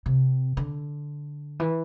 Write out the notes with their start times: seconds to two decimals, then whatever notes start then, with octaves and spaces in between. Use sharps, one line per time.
0.06 C3
0.57 D3
1.60 E3